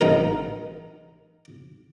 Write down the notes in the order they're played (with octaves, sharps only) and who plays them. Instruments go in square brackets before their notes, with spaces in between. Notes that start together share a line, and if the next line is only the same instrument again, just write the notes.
[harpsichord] A1 D#4 A#4